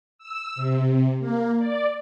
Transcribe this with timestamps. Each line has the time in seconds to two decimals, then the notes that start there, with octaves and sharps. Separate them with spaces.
0.19 E6
0.55 C3
1.19 A#3
1.58 D5